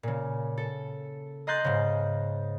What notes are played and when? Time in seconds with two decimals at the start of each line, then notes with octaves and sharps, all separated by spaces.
0.03 A#2 C#3
0.58 A4
1.47 D#5 A#5 C6 F#6 G6 A6
1.64 G#2 C#3